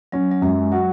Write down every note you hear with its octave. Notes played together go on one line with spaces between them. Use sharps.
F#3 C#4
F#3
F#2 G#3
F#3 F#4